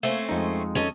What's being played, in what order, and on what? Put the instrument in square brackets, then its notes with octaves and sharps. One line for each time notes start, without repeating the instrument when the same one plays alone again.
[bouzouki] A3 C4 C#4 [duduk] A#3
[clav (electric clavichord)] F2 D#4 [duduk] G#3
[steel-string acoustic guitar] C#4 A4 D#5